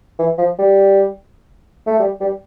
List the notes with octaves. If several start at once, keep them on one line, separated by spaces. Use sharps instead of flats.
E3
F3
G3
A3
G3
G3